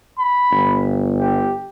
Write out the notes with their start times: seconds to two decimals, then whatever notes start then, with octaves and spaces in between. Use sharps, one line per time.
0.19 B5
0.51 G1
1.20 G4